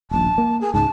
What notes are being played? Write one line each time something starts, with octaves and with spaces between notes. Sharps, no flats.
D#1 A#1 A5
A#3
G#4
C#2 G#2 A5